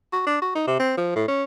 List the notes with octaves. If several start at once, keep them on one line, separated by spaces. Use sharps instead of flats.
F#4
D4
F#4
D#4
C3
C4
F3
A2
C#4